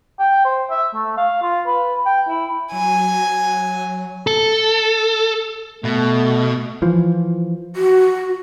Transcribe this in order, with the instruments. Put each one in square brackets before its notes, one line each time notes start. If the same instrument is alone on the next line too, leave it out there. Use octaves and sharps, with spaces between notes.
[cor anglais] G5
C5
E5
A3
F5
F4
B4
G5
E4
[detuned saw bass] F#3 [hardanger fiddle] G#5
[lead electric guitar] A4
[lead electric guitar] B2 [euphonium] A3
[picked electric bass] E3 F3
[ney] F#4